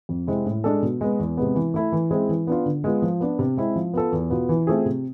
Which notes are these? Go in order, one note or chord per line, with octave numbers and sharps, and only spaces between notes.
F2
C3 G#3 C4 E4
A2
G#3 D4 A4
B2
G#3 B3
E2
C3 G#3 B3
E3
A3 E4 A4
E3
G#3 C4 E4 G#4
E3
B3 D4 F4
D3
G#3 B3 F4
F3
B3 D4
C3
G#3 C4 E4
F3
B3 F4 A4
E2
B2 B3 F4
E3
A3 C4 F4 G#4
C3